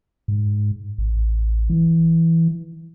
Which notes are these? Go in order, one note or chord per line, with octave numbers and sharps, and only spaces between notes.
G#2
A1
E3